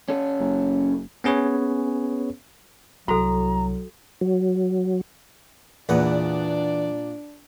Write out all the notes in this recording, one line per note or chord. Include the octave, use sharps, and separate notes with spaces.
C#4 A4
F#1
B3 C#4 G#4 B4 C#5
C2 F#3 F#4 A4 A#5
F#3
E2 A#2 D4 B4 D5 F#5